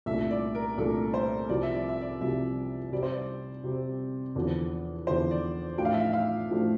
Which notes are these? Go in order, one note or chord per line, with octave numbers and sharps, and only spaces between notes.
C2 A#2 A3 D4 E5
D5
A#4
C2 A#2 A3 D4 A4
C5
C2 C3 F3 D5
E5
D5
E5
D5
C2 C3 F3 E5
C3 G3 C4 D5
C5
D5
C3 G3 C4
E2 D3 F3
E2 D3 F3 C5
D5
A2 F3 A3 D4 F4 G5
F5
E5
F5
F5
A2 F3 A3 D4 F4